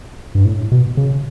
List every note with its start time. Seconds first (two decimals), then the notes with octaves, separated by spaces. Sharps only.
0.35 G2
0.45 A2
0.71 B2
0.97 C#3